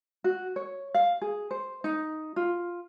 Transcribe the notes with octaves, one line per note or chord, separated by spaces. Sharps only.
F#4
C#5
F5
G#4
C5
D#4
F4